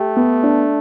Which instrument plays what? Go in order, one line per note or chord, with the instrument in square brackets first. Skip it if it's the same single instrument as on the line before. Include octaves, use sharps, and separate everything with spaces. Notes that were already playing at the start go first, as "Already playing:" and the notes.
Already playing: [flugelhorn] A3 [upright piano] G4
[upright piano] B3
D4